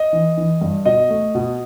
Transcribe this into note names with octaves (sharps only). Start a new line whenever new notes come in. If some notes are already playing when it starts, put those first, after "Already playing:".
Already playing: D#5
E3
E3
G2
B2 D#5
A3
B2